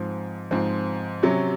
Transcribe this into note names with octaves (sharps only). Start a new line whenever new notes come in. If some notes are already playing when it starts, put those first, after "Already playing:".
Already playing: G#2 F3 C4
G#2 F3 C4
C3 F#3 C#4